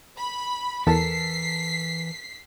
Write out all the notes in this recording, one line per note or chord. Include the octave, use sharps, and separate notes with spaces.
B5
E2 E3 A4 A#4 A5 B6 C7